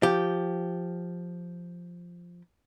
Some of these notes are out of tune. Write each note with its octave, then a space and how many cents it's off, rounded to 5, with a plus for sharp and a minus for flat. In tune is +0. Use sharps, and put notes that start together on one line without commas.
F3 +0 G4 +0